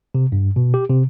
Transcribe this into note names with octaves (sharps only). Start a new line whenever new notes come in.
C3
G2
B2
G4
C3